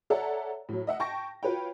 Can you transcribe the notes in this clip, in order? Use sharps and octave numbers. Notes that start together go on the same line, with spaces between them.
A4 C#5 D5 E5 F#5 A#5
A2 F#3
D#5 E5 F#5
G5 A5 C#6 A#6
F4 F#4 B4 C#5 G5